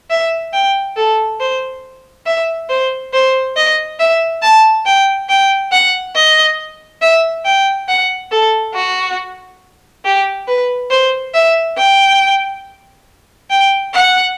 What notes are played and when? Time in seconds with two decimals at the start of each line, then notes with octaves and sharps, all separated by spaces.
0.10 E5
0.53 G5
0.97 A4
1.40 C5
2.27 E5
2.69 C5
3.13 C5
3.56 D#5
4.00 E5
4.42 A5
4.86 G5
5.29 G5
5.72 F#5
6.16 D#5
7.02 E5
7.45 G5
7.88 F#5
8.32 A4
8.75 F#4
10.05 G4
10.48 B4
10.90 C5
11.34 E5
11.77 G5
13.50 G5
13.94 F#5